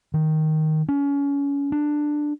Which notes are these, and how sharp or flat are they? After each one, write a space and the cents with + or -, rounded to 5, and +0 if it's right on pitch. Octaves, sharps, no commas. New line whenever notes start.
D#3 +5
C#4 +30
D4 +10